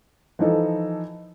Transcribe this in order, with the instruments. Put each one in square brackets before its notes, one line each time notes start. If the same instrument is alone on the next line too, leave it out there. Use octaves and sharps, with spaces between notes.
[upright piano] E3 F3 D#4 A4